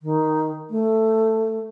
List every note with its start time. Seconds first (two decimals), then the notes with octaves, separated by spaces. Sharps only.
0.02 D#3
0.70 A3